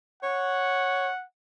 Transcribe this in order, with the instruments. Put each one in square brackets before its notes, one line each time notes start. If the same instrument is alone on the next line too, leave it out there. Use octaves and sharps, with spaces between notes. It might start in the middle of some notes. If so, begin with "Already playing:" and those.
[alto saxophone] C#5 [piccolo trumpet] F#5